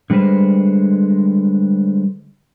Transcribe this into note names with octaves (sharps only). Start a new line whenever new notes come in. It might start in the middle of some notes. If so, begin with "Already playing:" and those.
D3 G3 G#3 B4 C5